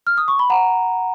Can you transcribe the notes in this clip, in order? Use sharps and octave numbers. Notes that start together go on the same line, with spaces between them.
F6
D#6
C#6
B5
F#5 A#5